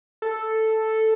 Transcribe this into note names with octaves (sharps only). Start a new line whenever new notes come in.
A4